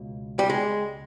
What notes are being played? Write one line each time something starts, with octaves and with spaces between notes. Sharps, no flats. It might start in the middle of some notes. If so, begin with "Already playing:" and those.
Already playing: C#2 B2
G3
G#3